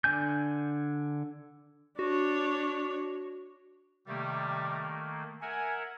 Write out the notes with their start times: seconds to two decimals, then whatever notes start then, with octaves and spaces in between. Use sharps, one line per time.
0.04 D3 D4 G#5 G6
1.99 D4 F#4 C#5
4.08 C3 D#3 G3 A3 A#3
5.42 A#4 E5 F#5 G#5